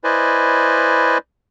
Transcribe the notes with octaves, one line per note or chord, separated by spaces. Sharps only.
E4 B4 C5 D5 D#5 G#5